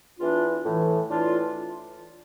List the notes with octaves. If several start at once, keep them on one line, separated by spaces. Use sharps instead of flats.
E2 E3 D4 F4
A2 E3
A2 E3 D4 F4